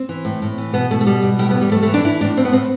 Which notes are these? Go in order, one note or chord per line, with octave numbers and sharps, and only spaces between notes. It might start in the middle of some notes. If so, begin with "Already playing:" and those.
Already playing: C4
E3
A2
A2
E3
B2 B3
B2 A3
A3
B2 G3
B2
A2 G3
B3
E3
G3
A2 A3
A3
E3
D4
E3 E4
A2 D4
A2 C4
B3
A2 C4